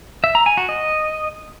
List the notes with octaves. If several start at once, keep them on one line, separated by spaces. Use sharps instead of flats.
E5
A#5
G#5
F#4
D#5